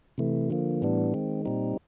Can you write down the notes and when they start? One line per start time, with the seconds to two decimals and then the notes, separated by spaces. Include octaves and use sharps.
0.18 C3 E3 A3
0.50 D3 F3 A#3
0.82 A2 E3 G3 B3 D4
1.14 D#3 G#3 C4
1.45 A#2 G3 C4 D#4